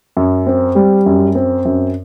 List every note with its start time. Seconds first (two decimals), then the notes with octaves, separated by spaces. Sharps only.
0.17 F#2
0.47 C4
0.75 G3
1.06 F#2
1.35 C4
1.65 F#2